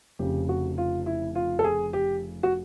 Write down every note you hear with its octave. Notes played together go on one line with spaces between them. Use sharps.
F1 F2 C#3 G4
F#4
F4
E4
F4
A4
G#4
G4
F#4